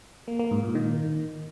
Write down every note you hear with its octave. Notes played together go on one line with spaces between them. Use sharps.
A#3
A#3
G#2
A#2
D#3